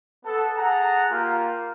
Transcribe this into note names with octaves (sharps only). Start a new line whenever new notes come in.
B3 A4
G#4 F#5 A5 A#5
A#3 F4 G4 A#4 F5